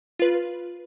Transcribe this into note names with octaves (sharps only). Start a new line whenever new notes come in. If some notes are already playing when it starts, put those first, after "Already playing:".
F4 B4